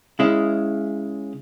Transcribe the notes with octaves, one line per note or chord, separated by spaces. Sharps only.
C#3 G#3 C#4 E4